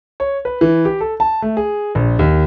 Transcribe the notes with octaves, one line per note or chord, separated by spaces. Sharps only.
C#5
B4
E3
G4
A4
A5
A3
G#4
A#1
D#2